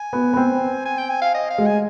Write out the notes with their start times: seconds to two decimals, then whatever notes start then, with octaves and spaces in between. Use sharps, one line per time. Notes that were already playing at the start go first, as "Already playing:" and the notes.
Already playing: G#5
0.13 B3
0.33 B3
0.37 C4
0.86 G#5
0.98 G5
1.09 G#5
1.21 F5
1.34 D#5
1.50 F5
1.58 G#3
1.66 G#5